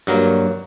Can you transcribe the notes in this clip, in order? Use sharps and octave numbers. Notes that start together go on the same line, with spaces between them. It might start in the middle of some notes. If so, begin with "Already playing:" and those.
G2 F#3 A#3